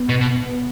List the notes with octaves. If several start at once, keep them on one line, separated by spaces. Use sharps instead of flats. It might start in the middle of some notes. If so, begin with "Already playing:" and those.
Already playing: B3
B2
B2